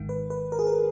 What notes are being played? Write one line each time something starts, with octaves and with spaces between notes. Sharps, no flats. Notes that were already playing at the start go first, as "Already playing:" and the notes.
Already playing: G#1 G#2 D#3
B4
B4
A#4
G#4
A#4